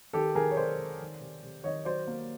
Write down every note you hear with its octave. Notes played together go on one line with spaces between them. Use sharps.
D#3 G4 A4
D#3 G#4 A#4
C#5
C3 C5 D5
C3
D#3
C3
C3
D#3 C#5 D#5
F#3 C5 D5
A#3